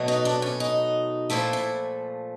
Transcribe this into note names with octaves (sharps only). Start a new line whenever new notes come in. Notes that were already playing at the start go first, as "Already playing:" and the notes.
Already playing: B2 F#3 A3
D#4
D4
C#4
D#4
A#2 F3 A3 E4
E4